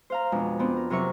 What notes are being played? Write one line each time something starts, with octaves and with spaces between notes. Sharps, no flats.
C5 F5 A#5
F2 B2 G#3 D4
B3 C4 D4
A#4
C3 F#3 A#4 E5 C#6